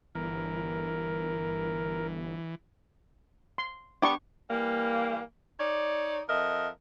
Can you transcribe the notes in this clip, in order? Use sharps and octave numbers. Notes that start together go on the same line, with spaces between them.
G1 E3 A#4
C6
B3 D4 G4 C#6
E3 G3 A#3
D#4 C#5 D5
F2 A#4 D#5 E5